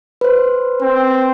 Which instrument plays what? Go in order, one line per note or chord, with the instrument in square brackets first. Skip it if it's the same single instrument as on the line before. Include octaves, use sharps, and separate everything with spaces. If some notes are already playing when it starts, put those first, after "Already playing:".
[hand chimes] B4 C5
[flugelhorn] C4